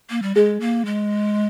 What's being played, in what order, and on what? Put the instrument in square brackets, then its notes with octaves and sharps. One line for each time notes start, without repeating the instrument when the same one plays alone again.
[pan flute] A#3
G3
[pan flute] G#3 [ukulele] G#4
[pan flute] A#3
G#3